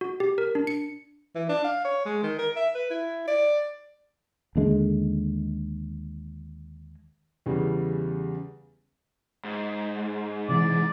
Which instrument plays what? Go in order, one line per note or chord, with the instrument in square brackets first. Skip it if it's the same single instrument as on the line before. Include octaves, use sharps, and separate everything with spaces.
[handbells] F#4
G4
A#4
D4
C#7
[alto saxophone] E3
D4
F5
C#5
G#3
D#3
A#4
E5
B4
E4
D5
[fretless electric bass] D#2 D3 G#3
[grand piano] E2 C#3 G3
[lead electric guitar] G#2
[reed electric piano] C3 E3 [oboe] D5